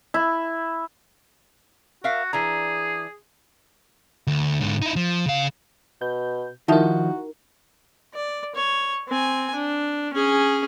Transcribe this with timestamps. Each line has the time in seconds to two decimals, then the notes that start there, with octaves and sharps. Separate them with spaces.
0.14 E4
2.04 F#4 A#4 E5 F5
2.33 E3 D4 G#4 A#5
4.27 D2
4.60 G#2 D3
4.82 D#4 E4
4.96 F3
5.26 C#3 F5
6.01 B2 G6
6.68 D#3 F3 D#4 E4 F#4 A#4 E5 A5
8.14 D5
8.55 C#5
9.08 C4 G#5
9.55 D4
10.13 C#4 G#4